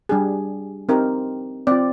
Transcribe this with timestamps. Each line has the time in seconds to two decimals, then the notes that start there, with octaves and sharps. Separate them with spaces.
0.09 G3 D4 G4 G#4
0.89 C4 D#4 G4 A#4
1.67 C4 F4 D5